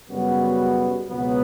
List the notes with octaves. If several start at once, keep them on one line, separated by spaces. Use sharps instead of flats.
F#2 C#3 G3 B3 F#4
C#2 B2 F#3 B3